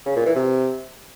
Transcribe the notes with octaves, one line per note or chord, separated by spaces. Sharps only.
C#3
A#2
E3
C3